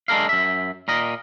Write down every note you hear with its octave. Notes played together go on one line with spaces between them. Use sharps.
G#3 D4 A4 A#4 F5
F#2 E5
A#2 A#4 D#5